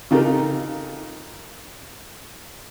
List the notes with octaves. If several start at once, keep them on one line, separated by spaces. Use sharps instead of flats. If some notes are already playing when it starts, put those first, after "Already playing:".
C#3 D#4 F4 G4 A4 A#4